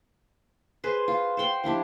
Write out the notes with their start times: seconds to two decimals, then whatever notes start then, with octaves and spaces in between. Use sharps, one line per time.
0.84 G#4 B4 C5
1.08 F4
1.37 C5 F#5 G5 C6
1.64 F3 D4 E4 G4